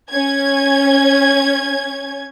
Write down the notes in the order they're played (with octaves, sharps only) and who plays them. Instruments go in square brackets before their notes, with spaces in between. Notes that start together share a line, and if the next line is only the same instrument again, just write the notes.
[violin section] C#4 G#6